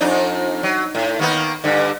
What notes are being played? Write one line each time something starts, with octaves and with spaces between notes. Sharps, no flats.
F2 D4 D#4
F#3
A2
D#3 A#3 B3
G2 D3